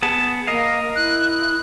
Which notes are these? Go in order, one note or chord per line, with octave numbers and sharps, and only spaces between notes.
B3 G#4 A5
A#3 A#4 D#5 F5
E4 F#6